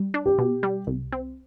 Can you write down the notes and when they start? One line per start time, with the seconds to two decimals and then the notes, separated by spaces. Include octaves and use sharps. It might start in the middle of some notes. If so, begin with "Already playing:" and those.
Already playing: G3
0.14 D4
0.26 G4
0.38 B2
0.63 G3
0.87 C2
1.12 C4